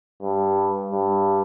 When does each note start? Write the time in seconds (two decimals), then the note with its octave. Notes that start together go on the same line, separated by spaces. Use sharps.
0.22 G2
0.91 G2